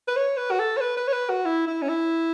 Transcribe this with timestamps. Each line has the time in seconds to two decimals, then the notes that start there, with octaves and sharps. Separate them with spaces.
0.08 B4
0.16 C#5
0.37 B4
0.51 F#4
0.59 A4
0.77 C#5
0.81 B4
0.97 B4
1.08 C#5
1.13 B4
1.29 F#4
1.45 E4
1.67 E4
1.82 C#4
1.89 E4